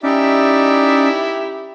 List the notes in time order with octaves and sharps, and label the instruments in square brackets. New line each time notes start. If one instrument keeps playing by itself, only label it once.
[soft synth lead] C#4 [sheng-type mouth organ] D#4 D5 E5 [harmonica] E4 G4